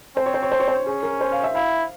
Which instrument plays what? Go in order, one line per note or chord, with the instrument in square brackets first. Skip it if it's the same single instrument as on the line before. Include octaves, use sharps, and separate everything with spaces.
[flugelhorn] C4 [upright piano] C5
[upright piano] C#5
C5
C#5
C5
C#5
C5
[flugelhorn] C#4 [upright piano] G#4
[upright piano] A#4
C5
F5
E5
[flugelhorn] E4 [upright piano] F5